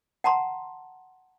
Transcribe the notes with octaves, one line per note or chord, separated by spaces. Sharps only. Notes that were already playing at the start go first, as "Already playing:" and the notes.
F#5 A5 A#5 C6